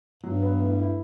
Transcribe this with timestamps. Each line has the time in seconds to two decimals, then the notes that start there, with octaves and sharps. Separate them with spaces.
0.23 G2 F#3
0.42 B3
0.61 A2
0.79 E4